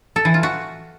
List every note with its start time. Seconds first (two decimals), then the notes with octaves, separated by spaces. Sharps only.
0.16 A4
0.25 E3
0.34 F4
0.43 F#4